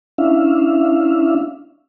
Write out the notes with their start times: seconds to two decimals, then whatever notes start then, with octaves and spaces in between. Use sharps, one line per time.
0.18 C#4 D4 E4 E5 F5